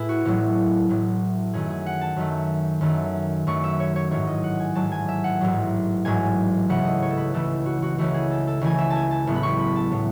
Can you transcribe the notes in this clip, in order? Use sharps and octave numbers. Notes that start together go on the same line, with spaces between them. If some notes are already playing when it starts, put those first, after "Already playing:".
Already playing: A2 E4 G#4 B4
F#4
A1 A2 F#3
A1 A2 F#3
F#2 D#3 A3 G#4
G#4
F#5
A5
F#2 D#3 A3
F#2 D#3 A3
F#2 D#3 A3 C#6
E5
C#5
C#5
A1 G#2 F#3 C#5
D#5
F#5
G#5
A1 G#2 F#3 A5
G#5
E5
F#5
A1 G#2 F#3
A1 G#2 F#3 G#5
C#2 C#3 E3 A3 F#5
D#5
C#5
A4
B4
C#2 C#3 E3 A3 A4
F#4
F#4
C#2 C#3 E3 A3 F#4
G#4
A4
A4
C#2 C#3 E3 A3 G#5
E5
A5
G#5
A5
A1 A2 F#3 B3
B5
C#6
B5
A5
A2 F#3 B3